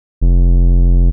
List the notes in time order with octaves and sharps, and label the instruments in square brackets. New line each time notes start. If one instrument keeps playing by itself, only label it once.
[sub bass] F1